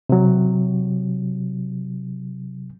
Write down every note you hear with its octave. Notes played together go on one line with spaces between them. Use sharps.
C3 F#3